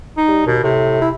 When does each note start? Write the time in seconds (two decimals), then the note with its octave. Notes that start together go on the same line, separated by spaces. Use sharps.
0.17 D#4
0.28 G3
0.47 D#2 B2
0.64 A2 C3
1.02 E4